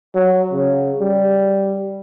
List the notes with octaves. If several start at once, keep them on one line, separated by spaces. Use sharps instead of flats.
F#3
C#3
G3